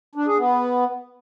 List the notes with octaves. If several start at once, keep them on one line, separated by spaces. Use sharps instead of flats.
D4
G#4
B3